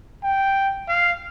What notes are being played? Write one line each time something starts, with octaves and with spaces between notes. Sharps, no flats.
G5
F5